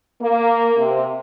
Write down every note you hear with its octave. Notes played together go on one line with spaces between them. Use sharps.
A#3
C3